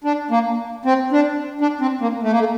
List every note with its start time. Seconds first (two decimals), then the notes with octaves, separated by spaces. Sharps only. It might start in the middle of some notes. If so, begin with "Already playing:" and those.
0.04 D4
0.31 A#3
0.85 C4
1.12 D4
1.61 D4
1.81 C4
2.01 A#3
2.23 A3
2.31 A#3
2.39 A3